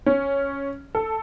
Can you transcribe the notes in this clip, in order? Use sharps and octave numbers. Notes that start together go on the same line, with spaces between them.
C#4
A4